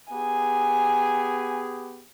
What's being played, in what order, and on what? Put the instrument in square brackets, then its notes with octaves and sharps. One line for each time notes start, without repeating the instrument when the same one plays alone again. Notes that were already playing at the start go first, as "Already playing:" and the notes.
[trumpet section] B3 G4 G#4 [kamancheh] G#5